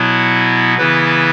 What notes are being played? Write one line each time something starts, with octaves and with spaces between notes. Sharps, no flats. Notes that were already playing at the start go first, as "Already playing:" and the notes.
Already playing: B2 F#3 B3 E4
C#3 E3 B3 E4 B4